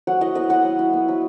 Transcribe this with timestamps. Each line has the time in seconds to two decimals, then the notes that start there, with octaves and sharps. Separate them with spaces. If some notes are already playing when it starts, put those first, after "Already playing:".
0.07 F#3 F#5
0.21 E4 D#5
0.35 B3 D#5
0.49 F#3 F#5
0.64 F#3
0.79 E4
0.93 B3
1.08 F#3